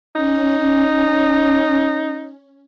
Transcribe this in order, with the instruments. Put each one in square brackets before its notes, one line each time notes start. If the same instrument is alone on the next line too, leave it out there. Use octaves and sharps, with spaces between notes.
[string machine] C#4 [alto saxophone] D#4